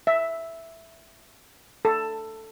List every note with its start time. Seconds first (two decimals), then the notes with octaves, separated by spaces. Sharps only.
0.07 E5
1.85 A4